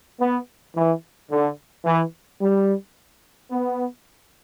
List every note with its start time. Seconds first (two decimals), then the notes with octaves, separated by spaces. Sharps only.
0.20 B3
0.75 E3
1.30 D3
1.85 E3
2.41 G3
3.51 B3